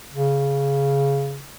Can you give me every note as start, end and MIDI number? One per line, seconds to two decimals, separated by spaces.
0.12 1.42 49